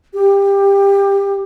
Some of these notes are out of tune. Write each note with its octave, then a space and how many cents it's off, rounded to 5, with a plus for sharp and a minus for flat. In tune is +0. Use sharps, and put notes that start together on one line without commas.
G4 +20